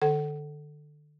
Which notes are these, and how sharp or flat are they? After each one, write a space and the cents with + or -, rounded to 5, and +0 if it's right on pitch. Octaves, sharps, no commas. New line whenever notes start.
D3 +35 A4 +0 F#5 +30